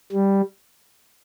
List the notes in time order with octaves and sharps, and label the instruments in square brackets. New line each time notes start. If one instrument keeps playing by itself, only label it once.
[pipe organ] G3